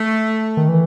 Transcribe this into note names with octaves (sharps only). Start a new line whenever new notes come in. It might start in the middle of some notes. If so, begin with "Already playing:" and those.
Already playing: A3
D#3
E3